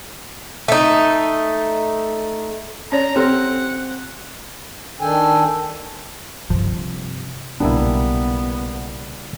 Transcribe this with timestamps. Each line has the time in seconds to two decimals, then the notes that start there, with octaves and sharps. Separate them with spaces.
0.68 A3 D#4
2.92 C#4 C#5 D5 A#5
3.16 C4 G4 A4 F#5 C6
5.01 D#3 D4 A4 G5 G#5
6.50 G2 C3 F3
7.60 B1 A#2 C#3 G3 A#3 B3 D4 E4